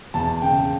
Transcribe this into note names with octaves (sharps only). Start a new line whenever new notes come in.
E2 A5
C#3 G5